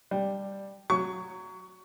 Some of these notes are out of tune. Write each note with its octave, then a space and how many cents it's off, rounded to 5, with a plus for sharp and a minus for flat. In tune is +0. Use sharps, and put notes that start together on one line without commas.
G3 +5 D4 +0
F#3 +0 C#6 +20